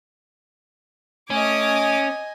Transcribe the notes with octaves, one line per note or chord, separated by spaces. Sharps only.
A3 C#4 D#5 G#5 D6 D#6